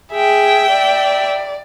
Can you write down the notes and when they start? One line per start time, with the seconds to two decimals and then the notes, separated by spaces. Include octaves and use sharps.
0.13 G#4 E5 G5
0.71 D5